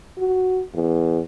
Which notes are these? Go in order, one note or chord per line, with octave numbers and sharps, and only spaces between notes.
F#4
E2